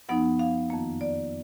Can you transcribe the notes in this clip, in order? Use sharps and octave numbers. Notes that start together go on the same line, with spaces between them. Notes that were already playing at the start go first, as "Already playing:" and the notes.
F#2 F3 B3 D#4 F#5
F5
F2 D#3 A#3
D5